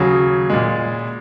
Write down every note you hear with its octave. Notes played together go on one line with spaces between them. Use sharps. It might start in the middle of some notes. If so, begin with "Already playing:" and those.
Already playing: D#2 C#3 F#3 G#4
A#2 G#3